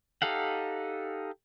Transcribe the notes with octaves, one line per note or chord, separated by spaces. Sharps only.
D#4 G4 A4 F5 F#5